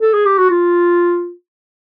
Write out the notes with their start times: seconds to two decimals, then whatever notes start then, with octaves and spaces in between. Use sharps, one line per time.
0.01 A4
0.13 G#4
0.25 G4
0.38 F#4
0.50 F4